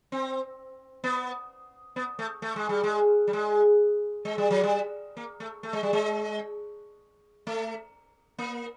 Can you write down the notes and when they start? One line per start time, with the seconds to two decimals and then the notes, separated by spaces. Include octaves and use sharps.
0.12 C4
1.04 B3
1.96 B3
2.19 A3
2.42 A3
2.56 G#3
2.69 G3
2.83 G#3
3.27 G3
3.33 G#3
4.25 G#3
4.38 G3
4.50 F#3
4.63 G3
5.17 A#3
5.40 A3
5.63 A3
5.73 G#3
5.83 G3
5.93 G#3
7.47 A3
8.38 A#3